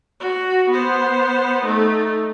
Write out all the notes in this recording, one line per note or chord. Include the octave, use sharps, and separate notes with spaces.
F#4
B3 C5
A3 D#4